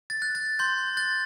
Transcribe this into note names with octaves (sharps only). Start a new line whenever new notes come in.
A6
F#6
A6
C6 G6
F#6 A6